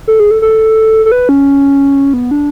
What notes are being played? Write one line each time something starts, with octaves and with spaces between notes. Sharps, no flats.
A4
G#4
A4
A4
A4
B4
C#4
B3
D4